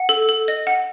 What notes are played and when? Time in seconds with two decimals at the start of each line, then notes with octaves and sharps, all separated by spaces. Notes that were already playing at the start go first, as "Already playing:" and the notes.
Already playing: F#5
0.09 A4
0.29 A4
0.48 D#5
0.67 F#5